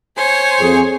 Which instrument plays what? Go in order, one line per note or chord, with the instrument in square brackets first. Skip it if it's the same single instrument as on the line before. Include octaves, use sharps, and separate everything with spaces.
[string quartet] C5 C#5 G#5
[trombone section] F2 [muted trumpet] G#4